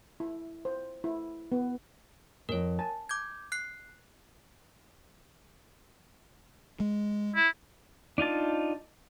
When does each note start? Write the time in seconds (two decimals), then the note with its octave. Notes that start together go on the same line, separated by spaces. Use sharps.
0.20 E4
0.65 C5
1.04 E4
1.52 B3
2.49 F2 G#2 A#4 C#5
2.79 G#5 A5
3.09 D6 G6 G#6
3.52 F#6 C7
6.80 G#3
7.36 E4
8.18 D4 D#4 F4 A5